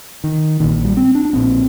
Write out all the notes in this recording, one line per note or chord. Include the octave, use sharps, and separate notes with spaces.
D#3
A#1 A#2 D#3
G3
C4
D4
D4
A#1 A#2 C4